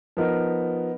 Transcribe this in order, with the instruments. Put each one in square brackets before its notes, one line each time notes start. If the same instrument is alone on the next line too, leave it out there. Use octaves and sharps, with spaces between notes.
[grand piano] F3 B3 D#4 A#4